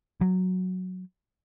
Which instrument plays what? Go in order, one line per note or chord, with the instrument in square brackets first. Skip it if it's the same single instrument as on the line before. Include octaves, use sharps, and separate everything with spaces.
[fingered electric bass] F#3